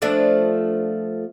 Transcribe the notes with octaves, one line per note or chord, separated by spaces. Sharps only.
F3 A3 D4